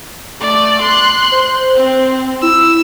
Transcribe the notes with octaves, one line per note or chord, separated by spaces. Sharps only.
A3 D5
C6 F#6
C5
C4
E4 E6